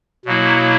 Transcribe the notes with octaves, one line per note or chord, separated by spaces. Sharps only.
B2 F#3 A#3 E4